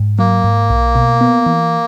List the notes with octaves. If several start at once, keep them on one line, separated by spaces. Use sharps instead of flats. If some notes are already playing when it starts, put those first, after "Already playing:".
Already playing: G#2
F#3 A#3
G#2
B1
B2
B3
E3